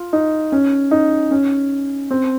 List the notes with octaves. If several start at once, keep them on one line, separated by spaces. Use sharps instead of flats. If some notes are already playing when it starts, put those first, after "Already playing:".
Already playing: F4
D#4
C#4
D#4
C#4
C4